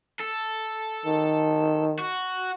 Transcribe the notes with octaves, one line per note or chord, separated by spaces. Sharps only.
A4
D#3
F#4